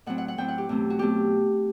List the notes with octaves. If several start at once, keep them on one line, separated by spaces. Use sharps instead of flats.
A2 F#3 C4 F#5
F#5
F#5
A2 F#3 C4 G5
F#5
G4
E2 B2 F#3 A3 C4
F#4
B2 F#3 A3 C4 G4